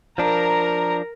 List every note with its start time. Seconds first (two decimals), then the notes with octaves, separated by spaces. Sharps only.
0.18 F3 D4 A#4 A#5